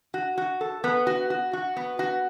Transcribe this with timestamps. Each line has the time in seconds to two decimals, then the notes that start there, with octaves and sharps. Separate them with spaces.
0.14 F#4
0.38 F#4
0.61 A4
0.84 B3
1.07 F#4
1.30 F#4
1.53 F#4
1.76 B3
1.99 F#4